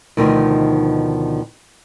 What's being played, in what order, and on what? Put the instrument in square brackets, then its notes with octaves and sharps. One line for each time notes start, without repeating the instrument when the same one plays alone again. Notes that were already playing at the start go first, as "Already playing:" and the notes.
[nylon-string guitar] D2 B2 D#3 F3 D#4